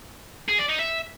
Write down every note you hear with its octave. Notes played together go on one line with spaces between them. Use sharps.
G#4
D5
D#4
E5